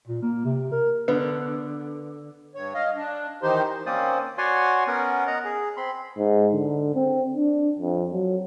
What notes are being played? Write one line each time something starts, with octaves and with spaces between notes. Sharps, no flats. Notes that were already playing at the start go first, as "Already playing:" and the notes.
A#2
A#3
C3
A#4
D3 B3 B4
G2 C#5
D#5 F5
D4
D#3 E3 D#4 G4 C5 C6
A#3 C4 C#4 C5 D5 D#6
F#4 C#5 D5 F#5 G#5 C6
B3 C#4 A#4 F#5
D#5 F#5 A#5
G#4
C4 B5 C6
G#2
D3
C4
D4
F2
F#3